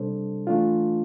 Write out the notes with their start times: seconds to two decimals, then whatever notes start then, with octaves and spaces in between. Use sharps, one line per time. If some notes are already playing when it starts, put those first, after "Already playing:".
Already playing: C3 G3 D4 A4 C5
0.47 E3 A3 D4 F4